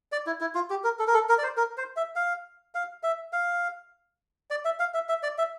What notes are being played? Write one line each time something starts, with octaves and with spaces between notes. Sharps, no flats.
D5
E4
E4
F4
G4
A#4
A4
A#4
A4
A#4
D5
C5
A#4
C5
E5
F5
F5
E5
F5
D5
E5
F5
E5
E5
D5
E5